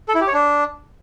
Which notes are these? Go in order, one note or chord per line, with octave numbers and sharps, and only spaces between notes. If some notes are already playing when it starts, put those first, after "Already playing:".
A4
E4
G4
C#5
D4